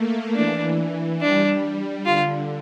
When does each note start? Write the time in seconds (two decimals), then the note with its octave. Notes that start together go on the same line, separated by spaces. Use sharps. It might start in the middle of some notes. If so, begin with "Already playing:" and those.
Already playing: A3 A#3
0.35 E3 D4
1.21 G3 D4
2.06 D3 F4